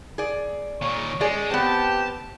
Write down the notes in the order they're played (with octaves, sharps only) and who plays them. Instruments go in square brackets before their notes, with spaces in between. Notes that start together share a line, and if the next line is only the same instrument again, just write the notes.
[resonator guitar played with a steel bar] G#4 D5
[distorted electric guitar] A#2 D#3 [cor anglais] C#5
[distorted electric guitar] G#3 [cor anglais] C#4 [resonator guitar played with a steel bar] G#4 D5
[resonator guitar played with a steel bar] B3 C4 [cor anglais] G4 [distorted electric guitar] A5